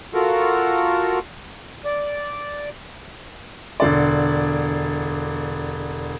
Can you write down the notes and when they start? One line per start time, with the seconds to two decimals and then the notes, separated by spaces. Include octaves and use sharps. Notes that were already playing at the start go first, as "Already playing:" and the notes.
0.14 F4 F#4 A4 A#4
1.85 D5
3.80 E1 D3 D5